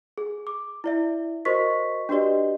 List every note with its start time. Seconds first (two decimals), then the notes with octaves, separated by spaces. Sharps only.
0.18 G#4
0.47 D6
0.84 E4 D5 E5
1.45 F#4 A#4 C5 D#5 C#6 B6
2.09 D4 F#4 G4 B4 D5 D#5